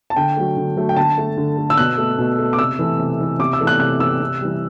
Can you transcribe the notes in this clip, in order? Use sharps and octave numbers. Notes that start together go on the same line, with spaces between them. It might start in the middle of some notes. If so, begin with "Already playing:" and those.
A5
D3 G5
F#3 A3
D3
F#3 A3
G5
D3 A5
A3
D3
A3
E6
B2 F#6
A3
B2
A3
D6
C3 E6
E3 A3
C3
E3 A3
C3 D6
E6
E3 A3
F#6
C3 F#6
E3 A3 E6
C3
E3 G3